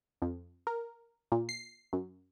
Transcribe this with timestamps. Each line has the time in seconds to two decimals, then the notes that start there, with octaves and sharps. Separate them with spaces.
0.22 F2
0.67 A#4
1.32 A#2
1.49 C7
1.93 F#2